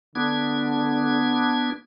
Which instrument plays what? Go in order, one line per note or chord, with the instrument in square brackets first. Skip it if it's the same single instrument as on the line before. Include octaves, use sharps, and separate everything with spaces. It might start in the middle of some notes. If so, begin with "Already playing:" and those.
[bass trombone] D3 [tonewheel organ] B3 D4 G#6